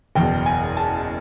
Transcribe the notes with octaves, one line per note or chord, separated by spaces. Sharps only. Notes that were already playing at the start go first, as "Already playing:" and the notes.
F#1 E2 B2 G5
G#5
A5